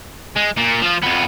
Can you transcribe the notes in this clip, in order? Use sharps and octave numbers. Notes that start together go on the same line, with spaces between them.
G#3
A#2
F3 F4
F2 B3